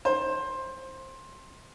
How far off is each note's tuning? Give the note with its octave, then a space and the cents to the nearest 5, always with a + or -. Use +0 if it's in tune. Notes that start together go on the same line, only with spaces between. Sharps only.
C5 +15